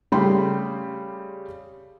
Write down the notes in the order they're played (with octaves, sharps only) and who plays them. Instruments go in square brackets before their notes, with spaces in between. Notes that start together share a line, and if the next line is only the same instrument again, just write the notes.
[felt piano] C#3 G3 A3 G5 B5 C6